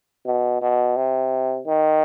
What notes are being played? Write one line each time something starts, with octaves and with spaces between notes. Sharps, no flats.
B2
B2
C3
D#3